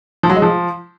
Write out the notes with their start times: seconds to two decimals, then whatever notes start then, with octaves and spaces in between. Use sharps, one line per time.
0.23 F3
0.30 F#3
0.36 G#3
0.42 F3